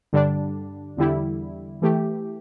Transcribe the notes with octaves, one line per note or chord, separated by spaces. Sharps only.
G2 D3 G3 D4
E2 D3 G3 E4
E3 A3 G4